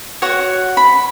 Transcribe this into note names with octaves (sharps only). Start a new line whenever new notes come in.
F#4 C#5 F#5
B5